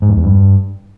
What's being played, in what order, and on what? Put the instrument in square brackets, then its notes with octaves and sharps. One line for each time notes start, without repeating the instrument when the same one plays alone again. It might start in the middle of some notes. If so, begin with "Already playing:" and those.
[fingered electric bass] G#2
F2
E2
G2